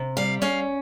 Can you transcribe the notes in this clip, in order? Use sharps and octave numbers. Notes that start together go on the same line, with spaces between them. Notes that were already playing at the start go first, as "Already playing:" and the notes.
Already playing: C3
G3 F5
C#4 F5